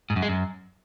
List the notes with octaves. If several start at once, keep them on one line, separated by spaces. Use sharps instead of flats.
G#2
F#2
G#3
F#2